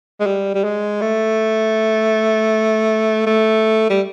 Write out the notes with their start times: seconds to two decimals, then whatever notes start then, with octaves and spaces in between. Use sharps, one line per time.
0.20 G#3
0.26 G3
0.55 G3
0.64 G#3
1.01 A3
3.27 A3
3.90 G3